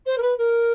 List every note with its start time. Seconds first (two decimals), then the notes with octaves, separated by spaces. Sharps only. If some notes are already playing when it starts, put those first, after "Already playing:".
0.06 C5
0.18 A#4
0.22 B4
0.38 A#4